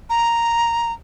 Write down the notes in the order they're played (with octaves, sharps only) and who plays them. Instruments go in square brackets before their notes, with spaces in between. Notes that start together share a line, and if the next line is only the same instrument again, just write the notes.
[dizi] A#5